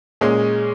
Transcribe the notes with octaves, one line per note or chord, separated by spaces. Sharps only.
A#2 G#3 C#4 G#4